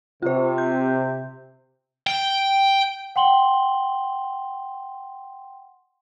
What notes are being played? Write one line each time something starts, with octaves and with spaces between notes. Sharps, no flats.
C3 F4 C5
G6
G5
F#5 G5 C6 F#7 G7